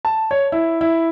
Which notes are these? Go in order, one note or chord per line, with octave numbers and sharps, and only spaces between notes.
A5
C#5
E4
E4